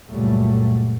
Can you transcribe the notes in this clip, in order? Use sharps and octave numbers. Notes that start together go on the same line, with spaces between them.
C#2 F#2 A#2 F#3 G3 A3